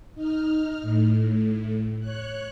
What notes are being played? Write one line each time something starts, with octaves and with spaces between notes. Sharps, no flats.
D#4 F6
A2
C#5 F#6